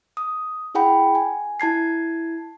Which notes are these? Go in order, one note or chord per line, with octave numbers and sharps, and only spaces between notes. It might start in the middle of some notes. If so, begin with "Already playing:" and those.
D#6
E4 G#4 F#5 G5 B5
G#5
E4 A5 G#6 C7